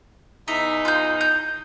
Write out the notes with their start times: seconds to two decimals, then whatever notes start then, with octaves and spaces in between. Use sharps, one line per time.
0.48 E2 D#4 E5
0.85 F4 G6
1.21 G6